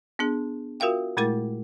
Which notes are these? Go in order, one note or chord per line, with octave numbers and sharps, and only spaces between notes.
B3 D4 G#4
F4 F#4 A#4 E5 F5 G5
A#2 G#3 A3 E4 A#4 A6